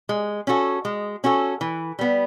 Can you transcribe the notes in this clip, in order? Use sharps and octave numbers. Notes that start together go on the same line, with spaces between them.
G#3
C#4 F#4 A4
G#3
C#4 F#4 A4
E3
G3 B3